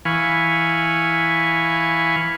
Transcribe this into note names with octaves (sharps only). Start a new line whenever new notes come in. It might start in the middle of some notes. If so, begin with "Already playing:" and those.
E3 F5 G#5 B5 C#6